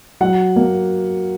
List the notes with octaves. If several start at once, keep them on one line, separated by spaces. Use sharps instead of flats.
F#3 F#5
A#3